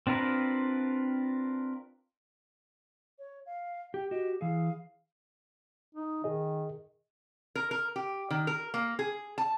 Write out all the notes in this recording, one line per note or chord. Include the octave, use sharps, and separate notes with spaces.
C4 D4 F4 A#4 B4
C#5
F5
G4 G5
F#4 G4 D#5
E3 G#4 F5
D#4
D#3 G#4 D#5
A#4
A#4
G4
D#3
A#4
A#3
G#4
A5